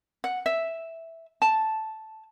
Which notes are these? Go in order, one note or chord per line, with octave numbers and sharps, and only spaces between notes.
F#5
E5
A5